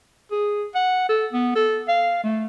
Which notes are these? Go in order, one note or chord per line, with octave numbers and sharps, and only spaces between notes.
G#4
F#5
A4
B3
A4
F5
A3